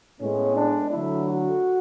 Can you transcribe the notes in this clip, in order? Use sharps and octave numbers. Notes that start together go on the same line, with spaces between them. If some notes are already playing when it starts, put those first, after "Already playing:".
A2 G#3 B3 C#4
D4
D3 F#3 A3 E4
F#4